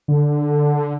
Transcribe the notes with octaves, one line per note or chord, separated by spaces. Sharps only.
D3